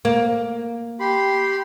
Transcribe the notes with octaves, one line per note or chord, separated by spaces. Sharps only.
A#3
G4 B5 C6